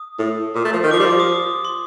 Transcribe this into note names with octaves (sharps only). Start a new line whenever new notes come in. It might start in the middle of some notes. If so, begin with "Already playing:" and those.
Already playing: D#6
A2
A#2
A3
F3
D#3
F3 D6
G3 C6
F3 D6
D#6
D6
C6